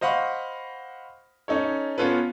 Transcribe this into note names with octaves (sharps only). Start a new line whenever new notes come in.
C5 D#5 F5 F#5 B5 C#6
C#4 D#4 A4 C#5
B3 C#4 F4 A4 B4